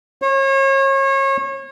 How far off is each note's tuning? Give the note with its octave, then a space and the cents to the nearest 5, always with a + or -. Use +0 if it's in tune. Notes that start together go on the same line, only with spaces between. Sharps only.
C#5 -35